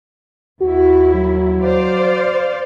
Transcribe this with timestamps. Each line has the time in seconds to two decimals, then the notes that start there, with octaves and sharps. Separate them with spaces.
0.61 D#2 E4 F#4
1.15 F#3
1.61 C5 D5 F5